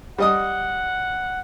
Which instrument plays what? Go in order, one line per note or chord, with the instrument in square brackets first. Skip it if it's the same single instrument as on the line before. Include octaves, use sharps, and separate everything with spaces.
[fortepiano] G3 D#5 D#6 [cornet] F#5